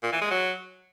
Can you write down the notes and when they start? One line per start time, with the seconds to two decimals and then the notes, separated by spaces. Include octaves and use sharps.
0.03 A#2
0.12 E3
0.21 G#3
0.30 F#3